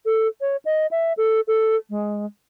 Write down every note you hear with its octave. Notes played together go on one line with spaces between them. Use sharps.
A4
C#5
D#5
E5
A4
A4
G#3